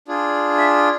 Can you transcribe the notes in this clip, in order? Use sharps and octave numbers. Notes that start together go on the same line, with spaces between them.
D4 F4 G#4
E5